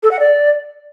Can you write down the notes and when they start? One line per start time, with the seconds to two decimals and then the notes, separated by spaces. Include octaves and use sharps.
0.03 A4
0.11 F#5
0.19 D5